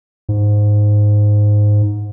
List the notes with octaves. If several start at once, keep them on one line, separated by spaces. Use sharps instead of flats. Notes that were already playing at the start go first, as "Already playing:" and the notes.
G#2